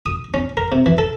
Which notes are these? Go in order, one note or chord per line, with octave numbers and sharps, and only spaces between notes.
D#6
C#4
A#4
C3
E3
A4